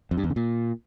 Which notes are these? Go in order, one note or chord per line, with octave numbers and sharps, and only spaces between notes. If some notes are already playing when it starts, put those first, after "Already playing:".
F2
G2
E2
C#3
A#2